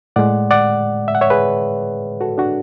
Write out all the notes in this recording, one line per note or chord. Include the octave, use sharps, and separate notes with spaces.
A2 G#3 D5 F#5
D5 F#5
E5
F#5
C#5 E5
G#4 B4
F#4 A4
D4 F#4